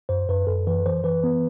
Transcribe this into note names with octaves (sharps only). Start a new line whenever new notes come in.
F#2 C5
F#2 B4
F#2 A4
E3 B4
E3 C5
E3 B4
B3